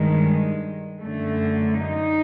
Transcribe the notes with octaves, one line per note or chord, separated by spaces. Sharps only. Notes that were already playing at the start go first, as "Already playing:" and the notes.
Already playing: G2 D#3 G#3
F#2 D3 A3
D#4